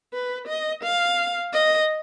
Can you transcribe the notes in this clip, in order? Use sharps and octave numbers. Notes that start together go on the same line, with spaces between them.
B4
D#5
F5
D#5